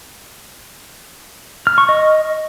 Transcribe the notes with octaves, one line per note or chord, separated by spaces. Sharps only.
F6
C#6
D#5